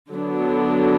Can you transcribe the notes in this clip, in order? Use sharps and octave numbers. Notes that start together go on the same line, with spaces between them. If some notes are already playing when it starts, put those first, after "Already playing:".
D3 F#3 B3 D4